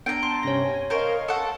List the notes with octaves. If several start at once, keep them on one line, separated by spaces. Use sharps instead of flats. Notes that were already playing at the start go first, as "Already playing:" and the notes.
B3 D4 G5 A#5
A5 C6
G2 C3 C#4 C#5 A#6
G#5
A#4 C5 D#5 F5 C#6
A4 F#5